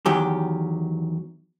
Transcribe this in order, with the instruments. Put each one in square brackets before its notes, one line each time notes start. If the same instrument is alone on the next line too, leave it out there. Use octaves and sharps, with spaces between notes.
[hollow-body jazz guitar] E2 D#3 F#3 G4